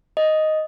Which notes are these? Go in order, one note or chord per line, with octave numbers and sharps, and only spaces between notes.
D#5